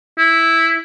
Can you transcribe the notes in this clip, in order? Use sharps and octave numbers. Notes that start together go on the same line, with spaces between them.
E4